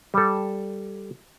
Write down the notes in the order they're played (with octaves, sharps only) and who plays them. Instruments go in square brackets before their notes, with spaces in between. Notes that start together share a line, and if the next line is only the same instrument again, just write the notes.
[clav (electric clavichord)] G3 A4